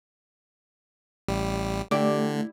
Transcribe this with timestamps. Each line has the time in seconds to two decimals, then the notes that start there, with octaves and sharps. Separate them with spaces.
1.28 A1 G3
1.91 D3 A3 E4 G4 D5